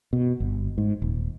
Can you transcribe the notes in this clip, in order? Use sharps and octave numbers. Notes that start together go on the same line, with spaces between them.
B2
G1
G#2
D#1